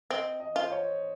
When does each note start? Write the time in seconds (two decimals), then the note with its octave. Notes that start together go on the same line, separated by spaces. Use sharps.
0.10 C4 D#5
0.40 D#5
0.56 F4
0.61 C5
0.72 C#5